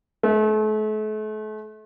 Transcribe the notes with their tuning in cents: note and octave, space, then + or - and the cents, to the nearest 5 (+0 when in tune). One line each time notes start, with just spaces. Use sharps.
A3 -40